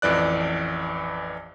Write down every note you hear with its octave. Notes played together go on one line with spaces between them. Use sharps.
A1 F2 E3 D5 F#6